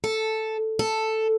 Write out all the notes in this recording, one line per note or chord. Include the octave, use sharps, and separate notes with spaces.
A4
A4